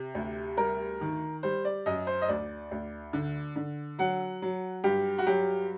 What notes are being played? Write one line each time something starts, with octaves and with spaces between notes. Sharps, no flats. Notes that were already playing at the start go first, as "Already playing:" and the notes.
Already playing: C3
D2
G3 A#4
D#3
G3 C5
D5
F#2 D#5
C5
D#5
D2 D5
D2
D3
D3
F#3 F#5
F#3
G2 G4
F#4
F#3 G4